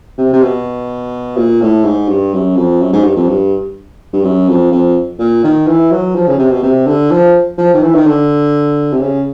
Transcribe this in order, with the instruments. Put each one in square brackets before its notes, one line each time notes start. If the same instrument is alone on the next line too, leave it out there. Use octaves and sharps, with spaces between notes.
[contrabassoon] C3
C3
B2
A#2
A2
G#2
G2
F#2
F2
F#2
G#2
G2
F2
G2
G2
F#2
F2
F2
A#2
D#3
E3
F#3
F3
C#3
C3
B2
C3
D3
F3
F3
D#3
E3
D#3
D3
C3
C#3